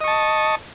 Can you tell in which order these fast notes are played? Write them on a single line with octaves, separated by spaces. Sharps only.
D#5 C#6 A5